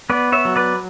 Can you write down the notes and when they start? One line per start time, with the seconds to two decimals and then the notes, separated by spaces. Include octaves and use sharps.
0.10 B3 B4 D5
0.32 C#5 E5
0.45 F#3
0.56 B4 D5